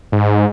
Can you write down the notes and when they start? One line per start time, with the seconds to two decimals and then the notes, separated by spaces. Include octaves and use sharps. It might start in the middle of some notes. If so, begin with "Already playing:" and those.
0.12 G#2